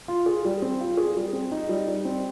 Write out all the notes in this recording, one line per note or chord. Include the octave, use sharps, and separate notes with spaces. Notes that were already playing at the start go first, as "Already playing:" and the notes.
F4
G#4
G3
C4
F4
G#4
G3
C4
D#4
G3
G3
C4